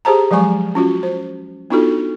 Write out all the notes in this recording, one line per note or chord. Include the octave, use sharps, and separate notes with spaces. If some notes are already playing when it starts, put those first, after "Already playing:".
G4 G#4 C5 A5 A#5
F3 F#3 G#3 G#5 C#6
C#4 F4 F#4
C5
B3 D4 D#4 F4 F#4 A4